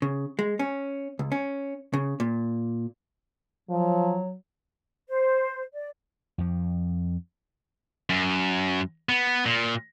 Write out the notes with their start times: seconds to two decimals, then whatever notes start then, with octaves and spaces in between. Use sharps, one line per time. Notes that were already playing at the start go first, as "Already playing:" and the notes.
0.02 C#3
0.39 G#3
0.59 C#4
1.19 C#2
1.32 C#4
1.94 C#3
2.20 A#2
3.70 F3 F#3
5.08 C5
5.74 D5
6.38 F2 F3
8.10 F#2
9.09 B3
9.46 A#2